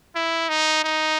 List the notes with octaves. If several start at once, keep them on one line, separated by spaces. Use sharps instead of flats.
E4
D#4
D#4